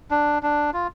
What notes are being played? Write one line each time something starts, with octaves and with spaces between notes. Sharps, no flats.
D4
D4
F4